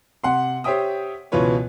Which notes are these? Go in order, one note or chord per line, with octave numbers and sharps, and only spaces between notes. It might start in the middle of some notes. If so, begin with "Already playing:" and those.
C3 F#5 C6
G4 C5 C#5 E5 G5 D#6
C#2 B2 E3 F4 B4 C#5